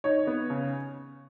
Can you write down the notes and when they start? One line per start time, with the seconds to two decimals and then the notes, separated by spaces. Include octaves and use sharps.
0.04 D#4 C#5
0.27 B3
0.50 C#3